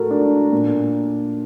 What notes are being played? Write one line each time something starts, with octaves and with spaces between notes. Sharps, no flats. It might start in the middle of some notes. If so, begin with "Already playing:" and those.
Already playing: A2 F#4 A4 A#4
D4
A#2